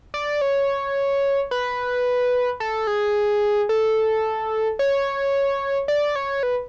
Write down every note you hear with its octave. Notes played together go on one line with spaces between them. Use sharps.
D5
C#5
B4
A4
G#4
A4
C#5
D5
C#5
B4